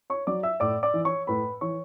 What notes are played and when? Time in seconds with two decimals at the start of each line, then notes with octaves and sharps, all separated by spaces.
0.10 C#5 C#6
0.27 F#3 D5 D6
0.43 E5 E6
0.60 A2 D5 D6
0.83 D5 D6
0.94 E3
1.05 C#5 C#6
1.27 A2 B4 B5
1.61 E3 C#5 C#6